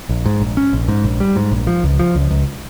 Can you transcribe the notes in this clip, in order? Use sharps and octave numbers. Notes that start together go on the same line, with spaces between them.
A#1
G#2
A#1
C#4
A#1
G#2
A#1
G3
G#2
A#1
F3
C#2
F3
C#2
C#2